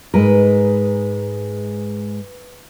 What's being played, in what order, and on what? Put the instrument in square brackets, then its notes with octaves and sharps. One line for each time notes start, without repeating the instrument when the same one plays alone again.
[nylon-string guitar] G#2 G#3 A#4 [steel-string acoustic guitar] B4